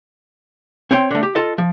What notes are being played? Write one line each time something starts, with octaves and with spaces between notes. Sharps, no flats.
C4 C#5 G5 C6
D3 A3
G4
F4 A4 D#5
F3